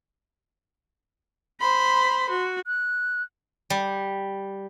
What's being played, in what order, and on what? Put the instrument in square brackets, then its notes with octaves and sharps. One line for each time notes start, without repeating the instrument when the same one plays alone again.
[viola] C5 B5 [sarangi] C6
[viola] F#4
[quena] F#6
[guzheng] G3